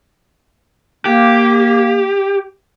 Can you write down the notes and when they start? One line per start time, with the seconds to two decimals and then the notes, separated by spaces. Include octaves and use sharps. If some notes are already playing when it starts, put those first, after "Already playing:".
1.05 A#3 G4